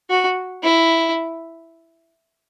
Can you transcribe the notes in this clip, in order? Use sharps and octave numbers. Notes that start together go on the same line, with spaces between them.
F#4
E4